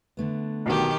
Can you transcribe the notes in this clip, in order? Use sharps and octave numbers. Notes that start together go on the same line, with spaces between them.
D3 A3 B3
B1 B2 D#3 F#3 G4